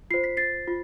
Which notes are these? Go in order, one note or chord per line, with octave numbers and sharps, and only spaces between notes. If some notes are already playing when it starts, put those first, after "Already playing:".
F4 C5 C7
B6
A6 C7
F4